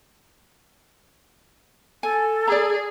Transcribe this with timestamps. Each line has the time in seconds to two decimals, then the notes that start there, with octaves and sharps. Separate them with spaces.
2.03 A4 G#5
2.48 G#4 D5 A#5